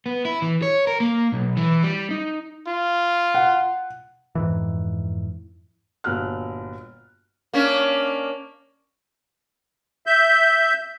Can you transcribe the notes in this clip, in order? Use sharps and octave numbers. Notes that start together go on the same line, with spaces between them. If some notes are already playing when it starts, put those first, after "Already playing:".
B3
E4
E3
C#5
A#4
A#3
B1
E3
G3
D#4
F4
F#5
F2 G#2 E3
G1 A#2 F#4 F6 F#6
A#3 C#4 D4
E5 G6